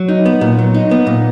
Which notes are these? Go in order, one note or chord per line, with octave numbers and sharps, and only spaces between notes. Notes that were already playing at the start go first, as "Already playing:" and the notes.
Already playing: F#3
D#4
B3
A#2
F#3
D#4
B3
A#2